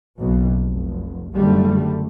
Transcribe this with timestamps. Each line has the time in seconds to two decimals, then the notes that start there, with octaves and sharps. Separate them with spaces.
0.18 F#1 B1 B2
0.64 F1
1.34 F#1 D3 G3 A3